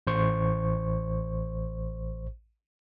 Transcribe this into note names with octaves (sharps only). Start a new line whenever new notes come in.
A1 C5 C#6